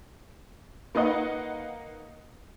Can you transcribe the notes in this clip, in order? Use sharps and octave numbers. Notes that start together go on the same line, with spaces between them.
A#3 D#4 B4 D#5 F#5